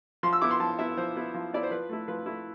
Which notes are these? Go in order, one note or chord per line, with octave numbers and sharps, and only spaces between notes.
F3 C6
E6
B3 E4 D6
C6
F3 A5
B3 E4 E5
F3 C5
B3 E4
F3
B3 E4 D5
C5
F3 B4
A3 E4
F3 B4
A3 E4